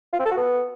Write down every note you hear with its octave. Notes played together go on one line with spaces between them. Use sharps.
F4
C4
A4
F#4
B3